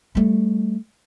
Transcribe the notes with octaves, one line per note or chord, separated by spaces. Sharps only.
G3 A3